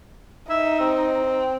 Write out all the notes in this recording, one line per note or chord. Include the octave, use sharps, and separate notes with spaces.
D#4 E5
C4